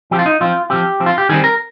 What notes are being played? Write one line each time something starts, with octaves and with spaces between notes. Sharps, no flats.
F3 C4 G4
F4
D#4
F3 C4 F4
F3 C4 G4
F3 C4
F4
G4
D#3 G3 C4 G#4
A#4